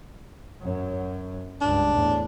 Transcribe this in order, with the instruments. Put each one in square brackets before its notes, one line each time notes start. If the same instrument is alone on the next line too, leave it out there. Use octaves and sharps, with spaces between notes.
[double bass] F#2 F#3
[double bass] C#2 G2 [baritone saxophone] D4
[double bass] E2 A2